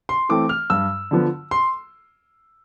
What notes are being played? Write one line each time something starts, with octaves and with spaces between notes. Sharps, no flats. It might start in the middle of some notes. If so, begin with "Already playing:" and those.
C6
E3 A3 C4 D6
F6
G2 E6
D3 F3 B3
C6